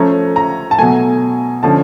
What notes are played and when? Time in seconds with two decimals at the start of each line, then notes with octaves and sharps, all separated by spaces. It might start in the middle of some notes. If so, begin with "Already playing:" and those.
Already playing: F3 A3 C#4 A#5
0.36 A#5
0.71 A5
0.78 B2 F#3 A3 G#5
1.63 D3 F3 A3 C#4 A5